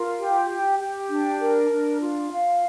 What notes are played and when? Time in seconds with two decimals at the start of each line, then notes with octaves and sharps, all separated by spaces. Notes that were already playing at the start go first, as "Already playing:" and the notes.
Already playing: F4 A#4
0.19 G4
0.49 G4
0.79 G4
1.09 D4
1.40 A#4
1.70 D4
2.01 F4
2.30 F5